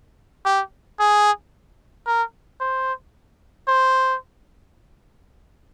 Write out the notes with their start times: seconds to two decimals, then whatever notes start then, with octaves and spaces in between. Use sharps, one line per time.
0.45 G4
0.99 G#4
2.07 A#4
2.60 C5
3.68 C5